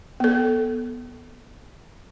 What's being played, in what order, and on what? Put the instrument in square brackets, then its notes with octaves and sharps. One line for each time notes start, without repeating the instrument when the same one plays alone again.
[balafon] B3 A4